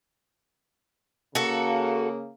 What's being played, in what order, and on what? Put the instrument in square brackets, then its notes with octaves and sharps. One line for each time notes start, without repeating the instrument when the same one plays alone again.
[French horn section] C#3 A#3 [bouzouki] F#4 A4